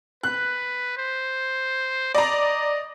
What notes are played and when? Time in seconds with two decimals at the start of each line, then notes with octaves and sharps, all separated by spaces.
0.23 B4 F#6
0.97 C5
2.15 D5 D#5 A#5